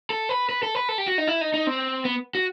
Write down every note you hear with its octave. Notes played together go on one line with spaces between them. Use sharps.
A4
B4
B4
A4
B4
A4
G4
F#4
D#4
E4
D#4
D#4
C4
B3
F#4